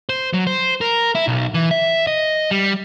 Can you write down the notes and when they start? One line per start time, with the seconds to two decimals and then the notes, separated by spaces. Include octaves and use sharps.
0.09 C5
0.34 F#3
0.47 C5
0.81 A#4
1.15 E4
1.28 B1
1.54 E3
1.71 E5
2.07 D#5
2.51 G3